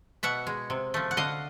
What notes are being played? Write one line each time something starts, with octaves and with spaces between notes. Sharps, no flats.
B2 E5 F#5
G#3
C3
F3 A3
F#5
D3 D#5 F5